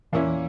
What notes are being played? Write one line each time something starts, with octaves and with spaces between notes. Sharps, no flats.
E2 A#2 E3 A#3 C#4 E4